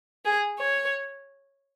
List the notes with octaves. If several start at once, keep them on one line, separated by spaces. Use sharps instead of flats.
G#4
C#5